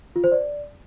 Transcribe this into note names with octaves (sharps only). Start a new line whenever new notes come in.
F4
C5
D5